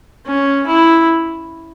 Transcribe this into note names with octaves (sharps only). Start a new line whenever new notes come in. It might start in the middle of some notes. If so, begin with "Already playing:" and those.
C#4
E4